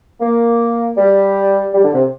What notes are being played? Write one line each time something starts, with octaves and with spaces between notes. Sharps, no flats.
A#3
G3
G3
D3
C3